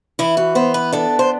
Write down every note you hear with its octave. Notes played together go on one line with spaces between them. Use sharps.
E3 E4
F#4
B3 C5
B4
D4 A4
C5